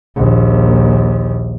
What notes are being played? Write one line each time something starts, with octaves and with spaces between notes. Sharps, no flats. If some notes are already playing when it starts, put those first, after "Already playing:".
A#1 D#2